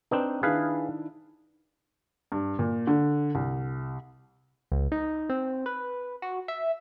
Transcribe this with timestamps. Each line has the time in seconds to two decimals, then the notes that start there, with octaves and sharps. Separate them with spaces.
0.11 C4 D4 D#4 B4
0.43 D#3 D4 E4 G#4 B4 F5
2.32 G2
2.59 A#2
2.87 D3
3.35 C2
4.72 C#2
4.92 D#4
5.30 C4
5.66 B4
6.22 F#4
6.48 E5